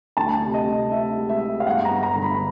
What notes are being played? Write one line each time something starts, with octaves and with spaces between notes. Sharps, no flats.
D2 A5
C3
D#5
C3
C3 E5
G#3
E5
G#3
F5
G1 F#5
A#5
G1
A#5
D3
B5